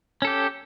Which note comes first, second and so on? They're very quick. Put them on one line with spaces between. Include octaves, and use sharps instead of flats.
C#4 A4 G4